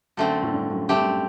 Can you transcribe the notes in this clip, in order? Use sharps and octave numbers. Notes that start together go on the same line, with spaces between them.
F#2 D3 A3 C4
A2
G2
F#2
G2 A3 C4 G4
F#2